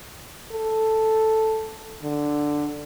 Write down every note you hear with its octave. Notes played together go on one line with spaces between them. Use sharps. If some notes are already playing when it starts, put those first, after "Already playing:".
A4
D3